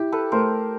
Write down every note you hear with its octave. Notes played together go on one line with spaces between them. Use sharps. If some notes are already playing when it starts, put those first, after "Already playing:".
Already playing: E4 G4
A4 B4
A3 A#4 C5